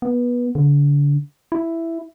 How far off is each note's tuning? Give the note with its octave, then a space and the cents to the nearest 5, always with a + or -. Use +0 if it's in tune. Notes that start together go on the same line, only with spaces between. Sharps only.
B3 -20
D3 -35
E4 +5